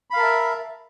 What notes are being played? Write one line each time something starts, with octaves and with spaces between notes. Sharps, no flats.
A#4 E5 F5 A5 B5